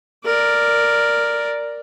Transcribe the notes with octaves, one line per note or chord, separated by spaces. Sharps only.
A#4 D5